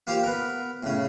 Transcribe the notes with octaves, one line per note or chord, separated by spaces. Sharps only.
A#3 F4 G4 C5
B3 A#4
A2 C#3